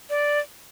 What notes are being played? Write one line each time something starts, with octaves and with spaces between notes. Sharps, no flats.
D5